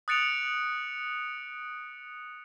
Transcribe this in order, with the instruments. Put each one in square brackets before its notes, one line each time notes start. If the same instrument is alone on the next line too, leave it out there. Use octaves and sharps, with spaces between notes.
[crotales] D#6 F#6 A6 C#7 D7 F7